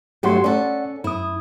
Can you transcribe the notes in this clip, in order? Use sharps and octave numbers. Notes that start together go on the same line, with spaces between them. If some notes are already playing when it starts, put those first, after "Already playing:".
G2 F#3 A3 G4 F#5 C6
C#4 A4 D5 F#5
F#2 E4 D#6